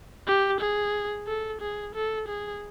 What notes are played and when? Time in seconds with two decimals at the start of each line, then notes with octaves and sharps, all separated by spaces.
0.27 G4
0.60 G#4
1.27 A4
1.61 G#4
1.95 A4
2.28 G#4